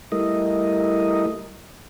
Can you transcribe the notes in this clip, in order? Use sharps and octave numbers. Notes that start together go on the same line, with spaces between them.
G3 A3 E4 A#4 D#5